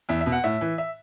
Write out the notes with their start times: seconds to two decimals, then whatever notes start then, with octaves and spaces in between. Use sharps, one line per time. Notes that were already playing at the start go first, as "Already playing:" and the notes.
0.09 E2 E5
0.21 E5
0.26 B2
0.32 F#5
0.44 A2 E5
0.61 E3
0.78 E5